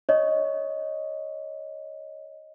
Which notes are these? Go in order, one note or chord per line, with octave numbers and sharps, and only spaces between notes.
C#5 D#5